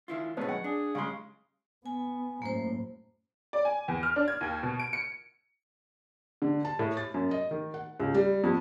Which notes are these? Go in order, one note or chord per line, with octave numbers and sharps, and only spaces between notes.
D#3 E4 F4
D#2 B2 G#3 A3 B3 C#4
F#2 F#5
D4 G#4
G2 C#3 G#3 C6
B3 G#5
F#2 A2 A#3 C5
D5
G#5
E2
F6
D4
G#6
D#2
B2
D7
C#7
D3
A5
A2
A6
F#2
D#5
D#3
F#5
C#2
G3
F2